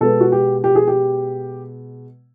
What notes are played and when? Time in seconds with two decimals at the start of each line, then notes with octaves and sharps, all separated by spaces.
0.01 B2 G#3 B3 A4
0.20 F#4
0.32 G4
0.64 G4
0.75 G#4
0.87 G4